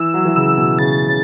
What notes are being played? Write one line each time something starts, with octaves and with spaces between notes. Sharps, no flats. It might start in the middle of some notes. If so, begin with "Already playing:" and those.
Already playing: E3 E6
F#3
E3
C#3 E6
B2
C#3 A6
C#3